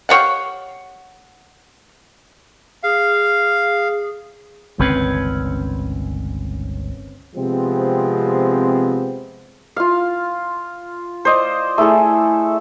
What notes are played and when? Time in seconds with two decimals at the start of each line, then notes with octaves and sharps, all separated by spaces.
0.09 G4 C#5 F5 F#5
2.83 G#4 F5
4.79 G1 C#2 D#3 C4 C#4 B4
7.35 C3 F3 G#3 B3 C4
9.76 F4 F5
11.25 C5 D5 D#5
11.78 A3 E4 G#4 A4